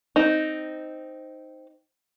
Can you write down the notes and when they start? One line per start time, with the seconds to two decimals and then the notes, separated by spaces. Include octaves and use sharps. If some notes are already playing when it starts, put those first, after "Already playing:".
0.16 C4 D#4